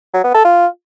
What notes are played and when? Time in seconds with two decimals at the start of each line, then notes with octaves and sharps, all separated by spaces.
0.14 F#3
0.24 B3
0.34 A4
0.45 F4